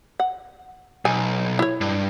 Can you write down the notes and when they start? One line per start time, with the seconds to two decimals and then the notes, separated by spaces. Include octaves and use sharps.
0.20 F#5
1.05 B1 G#5
1.59 E4 C#5
1.81 G2